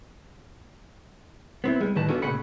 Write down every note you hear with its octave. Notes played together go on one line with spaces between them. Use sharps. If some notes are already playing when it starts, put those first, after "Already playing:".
B3 C4 E4
G3 G#3
D2 A2 D#3 B4 A5 A#5
B3 C#4 D4 F4 F#4 A4
A#2 C#3 A3 F#5 B5